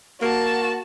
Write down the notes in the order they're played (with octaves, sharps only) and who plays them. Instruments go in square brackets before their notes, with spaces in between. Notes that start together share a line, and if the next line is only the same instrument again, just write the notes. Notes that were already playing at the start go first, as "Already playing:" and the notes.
[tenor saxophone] A#3 [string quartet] F#4 A5